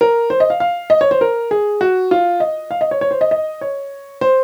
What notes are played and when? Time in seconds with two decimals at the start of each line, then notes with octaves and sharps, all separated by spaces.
0.01 A#4
0.30 C5
0.40 D#5
0.50 F5
0.60 F5
0.90 D#5
1.01 C#5
1.11 C5
1.21 A#4
1.51 G#4
1.81 F#4
2.11 F4
2.40 D#5
2.71 F5
2.81 D#5
2.91 C#5
3.01 C#5
3.11 C5
3.21 D#5
3.31 D#5
3.61 C#5
4.21 C5